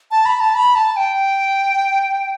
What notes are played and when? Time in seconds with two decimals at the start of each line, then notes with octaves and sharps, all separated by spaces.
0.11 A5
0.25 B5
0.40 A5
0.55 B5
0.75 A5
0.96 G5